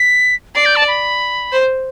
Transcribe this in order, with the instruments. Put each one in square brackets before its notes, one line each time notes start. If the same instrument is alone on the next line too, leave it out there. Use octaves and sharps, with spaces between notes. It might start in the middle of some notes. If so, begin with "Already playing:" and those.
Already playing: [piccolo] B6
[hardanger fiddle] D5 [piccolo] C7
[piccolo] G6
A5
B5
[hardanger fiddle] C5